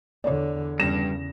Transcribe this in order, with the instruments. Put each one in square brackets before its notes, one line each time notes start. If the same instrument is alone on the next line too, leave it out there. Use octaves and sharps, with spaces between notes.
[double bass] E2 D3 [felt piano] C#5 D5
[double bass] E2 [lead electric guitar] G2 [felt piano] C#3 A#6 E7